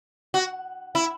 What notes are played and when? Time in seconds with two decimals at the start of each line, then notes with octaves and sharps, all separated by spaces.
0.34 F#4
0.95 E4